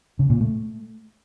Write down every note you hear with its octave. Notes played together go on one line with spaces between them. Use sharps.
C#3
A#2
A3